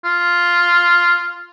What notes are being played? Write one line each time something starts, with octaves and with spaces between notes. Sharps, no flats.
F4